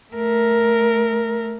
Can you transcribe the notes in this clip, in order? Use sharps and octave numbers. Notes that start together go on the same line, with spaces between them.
A3 A#4